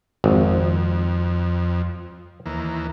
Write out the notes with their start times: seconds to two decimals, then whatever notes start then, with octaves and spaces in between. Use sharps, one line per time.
0.24 G#1 F2
2.46 D#2 E3 A#3